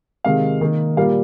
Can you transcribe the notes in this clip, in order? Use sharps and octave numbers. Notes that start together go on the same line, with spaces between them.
C3 D#3 G#3 F5
D#3 A#3
A#2 G3 A#3 F5